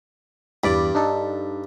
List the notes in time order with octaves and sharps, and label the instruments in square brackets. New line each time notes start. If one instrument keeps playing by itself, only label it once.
[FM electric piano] E2 D5 B5 [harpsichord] G2
[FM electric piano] D4 D#4 A4